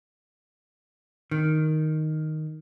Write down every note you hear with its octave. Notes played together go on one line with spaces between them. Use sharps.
D#3